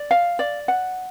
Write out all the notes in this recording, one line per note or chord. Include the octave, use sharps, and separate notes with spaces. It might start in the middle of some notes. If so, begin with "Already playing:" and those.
Already playing: D5
F5
D5
F#5